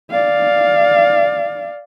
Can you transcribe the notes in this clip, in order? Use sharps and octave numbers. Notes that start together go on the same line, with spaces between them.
D5 F5